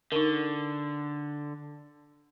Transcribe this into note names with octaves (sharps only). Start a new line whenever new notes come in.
D3 D#4 A#4